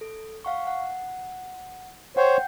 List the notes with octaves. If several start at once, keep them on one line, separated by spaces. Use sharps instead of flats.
A4
F5 F#5 C#6
F#5
C5 C#5 F#5 G5 G6